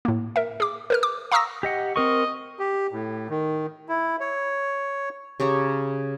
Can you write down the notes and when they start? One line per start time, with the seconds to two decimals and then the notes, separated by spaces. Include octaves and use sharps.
0.05 A2 A#3
0.36 A#4 E5
0.60 G#4 D6
0.90 A#4 B4 F6
1.03 D6
1.32 F5 A#5 C#6 D#6 E6 A#6
1.63 G4 D#5 F#5
1.96 C4 A#4 D#5 C#6
2.59 G4
2.92 A2
3.30 D#3
3.89 E4
4.20 C#5
5.40 C#3 G4 C#5 A#5